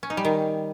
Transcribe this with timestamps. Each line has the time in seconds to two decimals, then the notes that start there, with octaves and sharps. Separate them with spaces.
0.03 C#4
0.10 D#4
0.17 G3
0.25 D#3